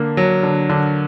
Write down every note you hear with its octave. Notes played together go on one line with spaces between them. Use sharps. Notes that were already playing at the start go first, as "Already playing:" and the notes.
Already playing: D3 A#3
F#3
D3
D3